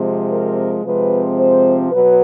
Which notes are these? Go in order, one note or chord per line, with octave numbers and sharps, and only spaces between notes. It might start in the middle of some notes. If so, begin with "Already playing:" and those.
Already playing: C3 F3 G#3 C4
A#4
C3 F3 G#3 C4 B4
C5
B2 F#3 B4